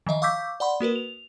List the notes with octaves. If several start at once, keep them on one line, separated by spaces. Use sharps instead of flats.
D#3 F3 D#5 E5
F5 C#6 D6 E6 G6 B6
D5 F#5 B5 C6
A#3 F#4 A#4 B4
F7